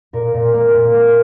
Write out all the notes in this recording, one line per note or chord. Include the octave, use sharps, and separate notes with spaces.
A#2 A#4
A#2
A#3
A#2
A#3